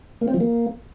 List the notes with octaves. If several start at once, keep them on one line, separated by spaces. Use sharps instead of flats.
A#3
C4
F3
A#3